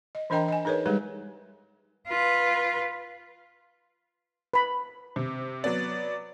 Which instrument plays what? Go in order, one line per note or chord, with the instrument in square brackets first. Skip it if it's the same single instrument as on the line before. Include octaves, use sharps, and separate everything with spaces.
[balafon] D#5
E3 D4 A#4 D#5 G5 A#5
D#5 G#5
D#4 G#4 A#4 B4 C#5
G3 G#3 D#4 G4 G#4 B4
[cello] F4 B4
[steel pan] B4 B5
[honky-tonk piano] C3
F#3 B3 D5